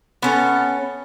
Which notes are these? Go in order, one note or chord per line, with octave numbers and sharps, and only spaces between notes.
B3 C#4 A4